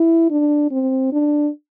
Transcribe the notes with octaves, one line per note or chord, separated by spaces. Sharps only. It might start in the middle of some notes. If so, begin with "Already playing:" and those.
Already playing: E4
D4
C4
D4